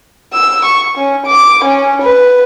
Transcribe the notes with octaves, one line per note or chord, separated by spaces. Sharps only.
E6
C#6
C#4
D6
C#4
B4